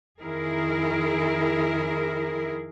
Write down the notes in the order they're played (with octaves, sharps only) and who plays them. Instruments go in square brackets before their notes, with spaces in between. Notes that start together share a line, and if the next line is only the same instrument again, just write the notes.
[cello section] F2 D#3 E4 G#4 A#4